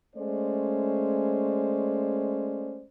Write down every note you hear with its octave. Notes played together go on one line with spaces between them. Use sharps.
G#3 A3 C#4 C5 D5